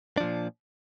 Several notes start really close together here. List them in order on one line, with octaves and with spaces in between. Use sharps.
D4 F3 A#2